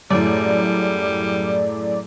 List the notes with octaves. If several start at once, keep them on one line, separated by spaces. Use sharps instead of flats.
F#2 A2 G3 A3 G#4 A4 D5